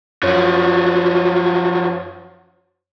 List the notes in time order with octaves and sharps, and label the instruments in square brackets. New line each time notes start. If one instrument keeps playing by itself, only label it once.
[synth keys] F#2 C#5 [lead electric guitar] F3 F#3